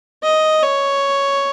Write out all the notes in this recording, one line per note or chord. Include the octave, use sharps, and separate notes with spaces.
D#5
C#5